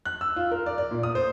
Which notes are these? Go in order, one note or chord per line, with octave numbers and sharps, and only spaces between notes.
F#6
E6
F4
A#4
D5
D5
A#2
D#6
C5